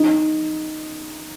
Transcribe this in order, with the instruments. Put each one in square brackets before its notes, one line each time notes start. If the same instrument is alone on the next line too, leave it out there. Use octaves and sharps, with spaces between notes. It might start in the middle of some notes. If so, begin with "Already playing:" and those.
Already playing: [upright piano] D#4